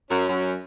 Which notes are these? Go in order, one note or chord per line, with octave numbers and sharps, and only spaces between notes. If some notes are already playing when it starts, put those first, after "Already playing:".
F#2 C#4
F#2